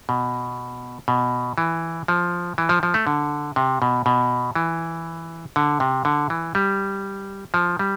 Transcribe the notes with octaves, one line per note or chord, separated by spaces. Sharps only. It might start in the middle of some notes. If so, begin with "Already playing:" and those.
B2
B2
E3
F3
E3
F3
F3
A3
D3
C3
B2
B2
E3
D3
C3
D3
E3
G3
F3
G3